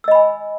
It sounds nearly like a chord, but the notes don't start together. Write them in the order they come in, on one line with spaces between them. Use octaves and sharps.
E6 D#5 B5 G#5